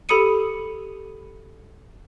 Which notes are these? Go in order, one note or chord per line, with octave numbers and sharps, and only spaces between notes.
G4 A4 B5 D#6 C#7 D#7